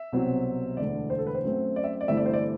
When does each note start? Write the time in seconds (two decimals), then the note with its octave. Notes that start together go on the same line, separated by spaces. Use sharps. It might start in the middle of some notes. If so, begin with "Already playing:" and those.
Already playing: E5
0.12 C2 B2 F#3 C4
0.77 E1 D2 D3 A3 D5
1.10 C5
1.19 A4
1.27 B4
1.35 C5
1.44 F#2 F#3 A3 C4
1.76 D5
1.84 E5
2.01 D5
2.08 G1 G2 E3 A3 C4 E5
2.17 D5
2.26 C5
2.33 D5